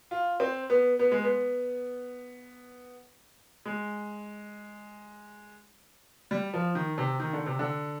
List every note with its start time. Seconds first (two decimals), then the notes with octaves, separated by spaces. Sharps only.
0.11 F4
0.40 C4
0.70 B3
0.99 B3
1.11 G#3
1.24 B3
3.66 G#3
6.31 G3
6.54 F3
6.75 D#3
6.98 C3
7.20 D#3
7.33 D3
7.46 C3
7.59 D3